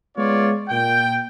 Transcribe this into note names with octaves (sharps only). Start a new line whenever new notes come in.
G#3 B3 F4 C#5 D5
A#2 G5